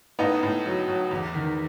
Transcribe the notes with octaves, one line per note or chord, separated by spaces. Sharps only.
A2 B3 D#4
A2
F#3
F#3
E2
D#3